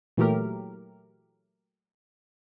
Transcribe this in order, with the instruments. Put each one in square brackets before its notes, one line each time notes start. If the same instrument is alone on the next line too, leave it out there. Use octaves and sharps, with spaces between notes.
[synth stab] A#2 E3 F#3 A3 G4 A#4